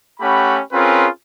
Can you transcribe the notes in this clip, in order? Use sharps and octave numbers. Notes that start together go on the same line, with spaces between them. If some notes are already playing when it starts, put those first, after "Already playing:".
A3 C#4 G4 F#5 B5
C4 C#4 F4 G#4 A#4 B4